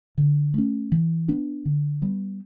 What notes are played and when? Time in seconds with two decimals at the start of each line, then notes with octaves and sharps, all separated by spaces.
0.18 D3
0.54 A3 C#4
0.92 E3
1.28 B3 D4
1.65 D3
2.02 G3 B3